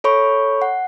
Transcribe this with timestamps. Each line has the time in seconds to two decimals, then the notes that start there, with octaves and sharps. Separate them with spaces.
0.04 A4 C#5 B5 C#6
0.62 F#5